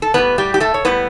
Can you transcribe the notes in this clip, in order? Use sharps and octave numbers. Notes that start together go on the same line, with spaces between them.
A4
A2 G3 B3 B4
G3 G4
G4
A3 A4
C#5
A2 G3 B3 B4